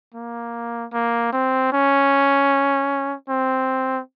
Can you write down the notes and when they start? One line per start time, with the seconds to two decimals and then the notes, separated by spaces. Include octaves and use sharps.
0.15 A#3
0.93 A#3
1.33 C4
1.73 C#4
3.29 C4